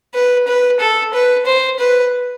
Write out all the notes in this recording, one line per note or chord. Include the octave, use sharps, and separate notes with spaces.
B4
B4
A4
B4
C5
B4